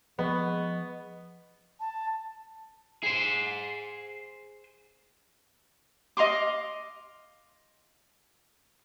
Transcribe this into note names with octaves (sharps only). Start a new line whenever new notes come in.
F3 G#3 B3 D#5 C#6
A5
G#4 C5
D#5 F5 C6 D6